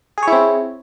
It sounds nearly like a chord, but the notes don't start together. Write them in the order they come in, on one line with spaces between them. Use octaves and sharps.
G#4 C#5 E4 C4